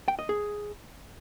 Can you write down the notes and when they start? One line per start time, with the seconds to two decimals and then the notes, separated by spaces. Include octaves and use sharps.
0.08 G5
0.19 D#5
0.29 G#4